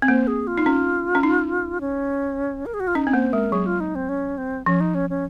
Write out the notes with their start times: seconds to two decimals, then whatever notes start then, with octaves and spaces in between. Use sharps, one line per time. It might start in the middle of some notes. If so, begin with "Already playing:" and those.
0.02 C4
0.08 A#3 C5
0.27 G#4
0.47 F4
0.58 D#4
0.66 C#4
1.15 C#4
1.23 D#4
1.81 C#4
2.66 A#4
2.74 G#4
2.80 F#4
2.87 F4
2.95 C#4 D#4
3.07 C4
3.14 A#3 C5
3.33 G#3 A#4
3.52 F#3 G#4
3.66 F4
3.80 D#4
3.95 C4
4.09 C#4
4.38 C4
4.66 F3 C#4
4.81 D#4
4.95 C#4
5.10 C#4